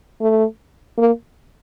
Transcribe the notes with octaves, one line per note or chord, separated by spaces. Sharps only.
A3
A#3